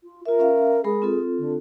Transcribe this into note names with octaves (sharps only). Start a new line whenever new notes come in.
F4
F4 A#4 E5
C#4 E5 F5
G#3 G#4 A#4 B5
C4 F4 A4
D3